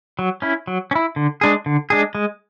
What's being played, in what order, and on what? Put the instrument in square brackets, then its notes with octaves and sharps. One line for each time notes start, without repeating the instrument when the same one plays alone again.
[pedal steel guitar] F#3
C#4 E4
F#3
C#4
E4
D3
G#3 D4 G#4
D3
G#3 D4 G#4
G#3